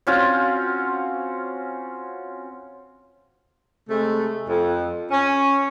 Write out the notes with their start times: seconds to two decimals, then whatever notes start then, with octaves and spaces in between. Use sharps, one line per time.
0.07 C4 C#4 F4 F#4
3.89 C3 G#3 A3
4.48 F2
5.11 C#4